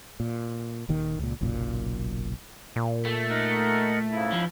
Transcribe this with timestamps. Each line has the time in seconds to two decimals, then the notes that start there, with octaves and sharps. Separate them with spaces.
0.20 A#2
0.89 D#1 D#2 D#3
1.19 C#2 A#2
1.41 F#1 B1 F#2 A#2
2.76 A#2
3.05 A3
3.30 D#4 A#4 F#5
4.11 G#2 C#3 E4
4.32 F3